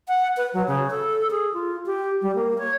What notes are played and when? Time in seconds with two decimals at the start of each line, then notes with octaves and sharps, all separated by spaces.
0.08 F#5
0.37 B4
0.54 F#3
0.68 C#3
0.91 A4
1.31 G#4
1.54 F4
1.86 G4
2.22 G3
2.35 A#3
2.58 C#5